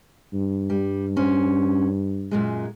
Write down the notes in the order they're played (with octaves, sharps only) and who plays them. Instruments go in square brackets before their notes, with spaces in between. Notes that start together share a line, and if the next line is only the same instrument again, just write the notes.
[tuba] G2
[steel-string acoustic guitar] G3
C#4 C5
F#2 A#2 G#3